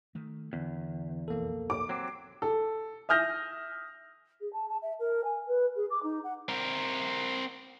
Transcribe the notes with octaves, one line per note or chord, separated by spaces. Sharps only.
D#3 A3
E2 D3
B1 F2 A#3 A4
D6
F#3 C4
A4
E5 D#6 F6 G6 A#6
G#4
A5
A5
E5
A#4
G#5
B4
G#4
D6
D#4
F#5
C4 A#4